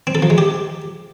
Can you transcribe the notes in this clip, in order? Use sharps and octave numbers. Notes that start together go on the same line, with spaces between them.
C4
A4
F3
G#3
G4